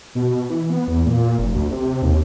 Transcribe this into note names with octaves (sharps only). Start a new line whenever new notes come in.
B2
B2
E3
B3
E2
A#2
F1
D2
C3
D#2